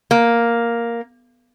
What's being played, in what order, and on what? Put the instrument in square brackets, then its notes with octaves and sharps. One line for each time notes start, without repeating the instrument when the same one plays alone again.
[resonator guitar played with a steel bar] A#3